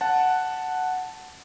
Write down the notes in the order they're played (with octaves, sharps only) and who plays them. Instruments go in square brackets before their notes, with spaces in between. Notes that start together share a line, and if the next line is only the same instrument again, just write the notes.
[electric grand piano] F#5 A5